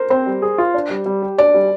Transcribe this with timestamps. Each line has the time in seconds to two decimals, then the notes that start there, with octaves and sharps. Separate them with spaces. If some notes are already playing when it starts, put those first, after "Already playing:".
Already playing: A#4 C5
0.10 C4 C5
0.26 G3
0.42 G#4
0.58 F4
0.74 D4
0.90 G3
1.06 G3
1.22 G4
1.38 D4 D5
1.54 G3